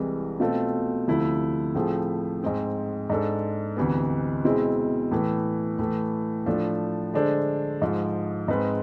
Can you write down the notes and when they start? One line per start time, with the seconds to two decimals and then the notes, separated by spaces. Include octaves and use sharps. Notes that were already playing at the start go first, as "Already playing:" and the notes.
Already playing: C2 C3 E3 G#3
0.40 B2 A3 C4 F4 A4
1.08 D2 C3 F3 A3 E4
1.75 A2 F3 A3 C4 G#4
2.42 G#2 G#3 C4 G#4
3.10 G#2 G#3 D4 A4
3.77 D2 C3 E3 B3
4.45 B2 G#3 C4 E4 G#4
5.11 A2 E3 A3
5.79 A2 E3 A3
6.46 A2 F3 A3 D4
7.14 D3 G#3 D4 A4 C5
7.82 G#2 F3 G#3
8.48 G#2 G#3 C4 G#4 B4